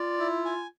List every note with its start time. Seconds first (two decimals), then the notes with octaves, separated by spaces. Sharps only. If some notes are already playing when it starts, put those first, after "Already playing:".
Already playing: F4 D5
0.19 E4
0.45 G#5